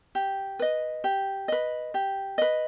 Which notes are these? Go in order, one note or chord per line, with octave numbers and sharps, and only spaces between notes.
G4
B4 D#5
G4
B4 D#5
G4
B4 D#5